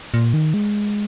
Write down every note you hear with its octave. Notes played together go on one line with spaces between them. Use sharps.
A#2
D#3
G#3